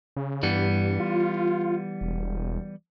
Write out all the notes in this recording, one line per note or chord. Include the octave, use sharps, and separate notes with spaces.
C#3
G2 E3 G3 B3
F4
E1